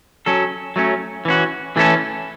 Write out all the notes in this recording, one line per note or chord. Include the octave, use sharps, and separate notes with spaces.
F#3 C#4 A4
F#3 A3 C#4
E3 C#4 F#4
E3 A3 C#4 A4